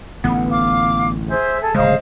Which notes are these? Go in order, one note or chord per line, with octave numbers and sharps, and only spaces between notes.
A1 D3 B3
F5 D6
G#4 C5 E5
G#4 A4
D1 C#3 G#3 C5 D#5 F5